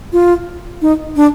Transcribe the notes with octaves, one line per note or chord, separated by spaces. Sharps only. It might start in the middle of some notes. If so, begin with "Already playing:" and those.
F4
D#4
D4